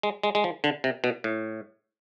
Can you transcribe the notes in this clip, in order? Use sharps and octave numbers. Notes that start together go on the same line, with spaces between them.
G#3
G#3
G#3
F3
D3
C3
B2
A2